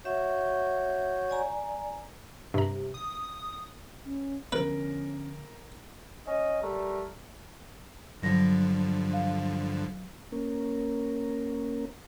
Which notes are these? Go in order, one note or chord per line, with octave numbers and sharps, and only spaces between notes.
F#4 C#5 E5 G6
D5 G#5 A#5
G2 C3 A#5
D#6
C#4
D3 F3 B3 C#4 A#4 B4
C#4 D#5
G3 A3 A#4
G2 D3 F3 F#3 A#6
F5
A#3 C#4 A#4